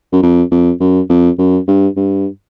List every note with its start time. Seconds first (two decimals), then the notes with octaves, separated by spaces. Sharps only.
0.12 F#2
0.23 F2
0.51 F2
0.80 F#2
1.10 F2
1.39 F#2
1.68 G2
1.96 G2